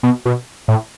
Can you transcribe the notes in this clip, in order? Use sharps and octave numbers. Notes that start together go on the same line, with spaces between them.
B2
B2
A2